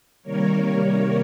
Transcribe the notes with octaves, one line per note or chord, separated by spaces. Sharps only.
C3 D#3 G3 A#3 A#4 C#5